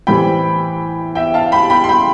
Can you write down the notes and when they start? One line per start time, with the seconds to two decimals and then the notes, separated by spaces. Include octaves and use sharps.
0.07 A2 E3 G3 C4 G5 B5
1.15 E5 G5
1.34 F5 A5
1.52 G5 B5
1.70 G5 B5
1.84 C6
1.89 G5 B5